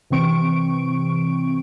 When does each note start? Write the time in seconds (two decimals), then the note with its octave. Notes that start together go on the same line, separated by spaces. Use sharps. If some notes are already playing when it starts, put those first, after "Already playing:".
0.10 C3 E3 C4 C#6 D7